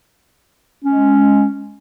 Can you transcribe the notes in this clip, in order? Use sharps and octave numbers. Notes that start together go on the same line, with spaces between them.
G#3 C#4